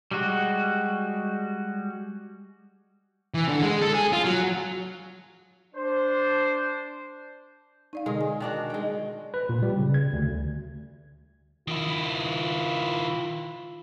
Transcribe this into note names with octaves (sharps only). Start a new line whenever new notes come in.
G3 G#3 F#4
E3
D3
G#3
A4
G#4
F4
F#3
D4 C5
D#4 D5 F5
B2 D3 G#3 A#4
G#5
D#3 D4 F#4
G#3 G5
B4
A#2
G3
C#3
G#6
D2
D#3 E4 F4